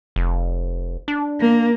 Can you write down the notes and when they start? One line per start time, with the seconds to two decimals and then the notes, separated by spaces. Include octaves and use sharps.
0.16 F1
1.08 D4
1.40 A#3